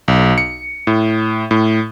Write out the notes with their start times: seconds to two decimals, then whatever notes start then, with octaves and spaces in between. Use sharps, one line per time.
0.08 B1
0.38 C#7
0.87 A2
1.51 A2